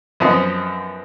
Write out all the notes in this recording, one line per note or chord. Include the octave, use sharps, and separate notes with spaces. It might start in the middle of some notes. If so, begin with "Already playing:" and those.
F#2 F3 B3 C4 D#5 C6